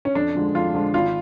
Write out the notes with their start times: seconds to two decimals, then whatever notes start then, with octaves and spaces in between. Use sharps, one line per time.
0.05 C#4
0.15 F2 D4
0.35 D3 F3 G#3
0.55 F2 F4
0.74 D3 F3 G#3
0.94 G#1 F4